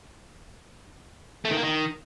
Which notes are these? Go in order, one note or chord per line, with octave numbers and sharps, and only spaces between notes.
A3
D#3
A#3
D#3